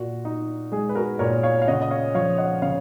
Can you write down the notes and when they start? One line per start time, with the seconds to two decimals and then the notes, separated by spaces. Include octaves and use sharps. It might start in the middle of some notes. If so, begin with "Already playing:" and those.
Already playing: A#2 F#4
0.25 D#4
0.72 G#3 G#4
0.89 B4
0.95 F#4 A#4
1.19 A#2 A#4 C#5
1.43 C#5 F5
1.62 F5
1.67 C#3 D#5 F#5
1.82 D#5
1.91 C#5 F5
2.14 F3 C#5 F5
2.38 D#5 F#5
2.62 C#3 C#5 F5